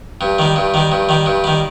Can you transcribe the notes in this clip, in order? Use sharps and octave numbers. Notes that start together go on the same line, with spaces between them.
G2
D#3 G3
G2
D#3 G3
G2
D#3 G3
G2
D#3 G3